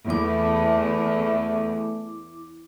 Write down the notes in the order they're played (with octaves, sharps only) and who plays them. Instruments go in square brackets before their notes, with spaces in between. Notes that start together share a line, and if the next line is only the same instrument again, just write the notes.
[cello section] E2 [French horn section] A3 [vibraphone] E4 D6